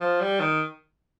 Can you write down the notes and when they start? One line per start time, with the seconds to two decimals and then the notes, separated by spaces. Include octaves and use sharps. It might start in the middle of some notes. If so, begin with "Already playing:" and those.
0.01 F3
0.21 G3
0.40 D#3